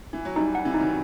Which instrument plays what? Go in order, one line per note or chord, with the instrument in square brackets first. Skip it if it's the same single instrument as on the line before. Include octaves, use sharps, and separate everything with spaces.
[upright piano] E3
F#3
[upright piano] E3 G3 [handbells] D#4
[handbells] F#5
[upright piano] C3 E3
[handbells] D#4
[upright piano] D#3 F#3